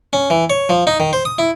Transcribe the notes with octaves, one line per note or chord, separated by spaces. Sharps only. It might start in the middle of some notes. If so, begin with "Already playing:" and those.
C#4
E3
C#5
F3
D#4
D#3
C5
D#6
E4